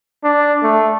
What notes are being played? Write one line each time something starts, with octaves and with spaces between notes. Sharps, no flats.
D4
A3